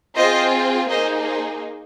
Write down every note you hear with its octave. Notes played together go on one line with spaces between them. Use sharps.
C4 F4 G#4 C5 D#5
A#3 D#4 G#4 C5 D#5
C5